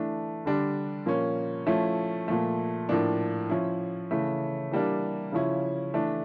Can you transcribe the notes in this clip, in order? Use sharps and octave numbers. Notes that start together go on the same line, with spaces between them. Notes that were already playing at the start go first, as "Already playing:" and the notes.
Already playing: E3 A3 D4
D3 G3 D4
A#2 F3 A#3 C#4
F3 A3 C#4 E4
A#2 F3 A3
A2 F3 A#3 D4
F3 C#4 E4
C#3 E3 A3
E3 G3 A#3 D4
C#3 F3 C#4 E4
E3 A3 D4